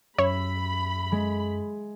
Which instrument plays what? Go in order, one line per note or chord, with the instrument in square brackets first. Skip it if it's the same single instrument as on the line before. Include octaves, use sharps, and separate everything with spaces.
[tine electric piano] F#2 [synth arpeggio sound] C#5 [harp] E5 [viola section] B5
[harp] G#3